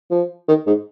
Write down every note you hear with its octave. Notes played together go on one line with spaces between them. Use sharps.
F3
D#3
G#2